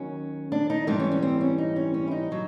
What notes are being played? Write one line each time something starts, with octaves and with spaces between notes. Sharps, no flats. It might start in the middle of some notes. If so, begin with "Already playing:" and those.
Already playing: D#2 D#3 F#3 C#4
D4
D#4
G#2 E3 G3 D4
C#4
C#4
C4
C#4
D#4
C#4
C#4
E4
D#4
D3 F#3